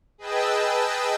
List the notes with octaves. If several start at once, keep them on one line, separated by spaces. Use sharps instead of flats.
G#4 B4 D#5 G5 A5 E6